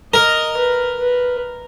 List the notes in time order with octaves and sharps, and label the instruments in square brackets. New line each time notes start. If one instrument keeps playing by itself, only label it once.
[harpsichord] A#4 [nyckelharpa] D#5
[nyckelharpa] B4
B4